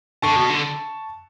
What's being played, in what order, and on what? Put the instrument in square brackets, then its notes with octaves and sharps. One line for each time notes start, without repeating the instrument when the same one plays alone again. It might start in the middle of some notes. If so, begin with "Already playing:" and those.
[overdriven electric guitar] D3 [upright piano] A5 C#6
[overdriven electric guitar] B2
D3